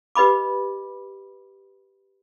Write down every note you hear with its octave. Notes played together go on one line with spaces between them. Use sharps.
G4 B4 D#5 B5 D6